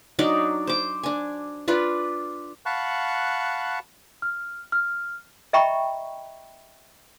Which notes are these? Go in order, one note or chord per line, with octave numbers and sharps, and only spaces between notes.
F#3 D4 D#4 D5
C5 D6
D4 G#5
D4 F4 B4 D5
F5 F#5 A5 B5 C#6 F#6
F6
F6
D#5 E5 G5 A#5 B5 C#6